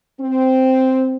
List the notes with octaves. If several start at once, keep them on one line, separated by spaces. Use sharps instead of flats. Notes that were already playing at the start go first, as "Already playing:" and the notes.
C4